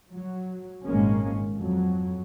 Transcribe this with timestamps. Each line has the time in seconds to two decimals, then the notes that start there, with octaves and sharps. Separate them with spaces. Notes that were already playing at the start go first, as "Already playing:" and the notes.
0.13 F#3
0.86 G#1 A#2 G#3 A#3 C#4
1.57 F2 F#3